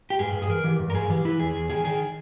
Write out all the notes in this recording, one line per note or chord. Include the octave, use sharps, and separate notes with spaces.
G4
G2 G#4
G2
G#4
E3 A#4
E3 G4
G2
A#4
G2 G#4
E3 G4
E3 E4
E2 G#4
E2
D#3 G#4
D#3 G#4